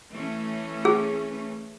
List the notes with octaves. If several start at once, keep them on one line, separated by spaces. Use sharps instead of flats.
E3 A3 C#4
G#4